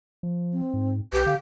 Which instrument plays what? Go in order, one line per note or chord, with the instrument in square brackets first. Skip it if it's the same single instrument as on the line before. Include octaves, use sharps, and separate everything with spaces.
[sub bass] F3
[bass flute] C4
[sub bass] G#2
[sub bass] B1 [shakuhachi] G4 [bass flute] B4
[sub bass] D3 [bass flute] F5